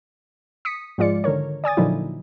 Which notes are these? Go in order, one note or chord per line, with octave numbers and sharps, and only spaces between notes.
D#6 B6 C#7
G#2 F3 G#3 F4 D5 C#7
D3 D#3 A#4 C#5
D5 G#5 D#6 A6
A#2 D3 F3 F#3 D#4 E4